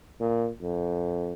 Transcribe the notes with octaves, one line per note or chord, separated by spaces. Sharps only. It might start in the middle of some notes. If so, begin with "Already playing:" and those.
A#2
F2